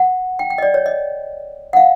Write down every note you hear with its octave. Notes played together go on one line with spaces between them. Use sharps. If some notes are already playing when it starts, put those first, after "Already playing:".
Already playing: F#5
G5
G5
D#5
D5
C#5
D#5
F#5
F5